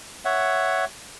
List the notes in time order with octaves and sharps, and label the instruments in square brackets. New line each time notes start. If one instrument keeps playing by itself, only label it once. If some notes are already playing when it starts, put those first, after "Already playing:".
[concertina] C#5 E5 F#5